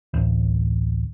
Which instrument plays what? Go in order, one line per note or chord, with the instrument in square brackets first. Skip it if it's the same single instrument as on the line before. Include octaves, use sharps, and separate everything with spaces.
[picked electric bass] A1 D2